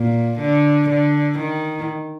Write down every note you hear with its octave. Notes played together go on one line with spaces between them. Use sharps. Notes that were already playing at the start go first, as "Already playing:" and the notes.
Already playing: A#2
D3
D3
D#3